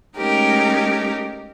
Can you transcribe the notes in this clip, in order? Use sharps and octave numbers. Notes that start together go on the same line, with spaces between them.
G#3 A3 C#4 D#4 G4 A#4